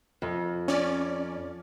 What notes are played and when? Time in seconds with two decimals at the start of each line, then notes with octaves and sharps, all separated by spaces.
0.22 F2
0.68 C#4 D5